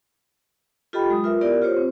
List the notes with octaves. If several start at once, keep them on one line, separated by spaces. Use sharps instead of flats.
F4 G4 A4 D#5 G5 B5
F#3 G#3 D#6
F4 A#4 B4 E5
B3 E4 G4 A#4 D5
F4 G4 C5 C#5
C4